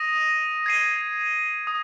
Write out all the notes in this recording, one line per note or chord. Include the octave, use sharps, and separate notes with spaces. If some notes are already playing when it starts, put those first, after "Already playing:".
Already playing: D#6 A#6 D#7
G#6 C7 D#7
D#6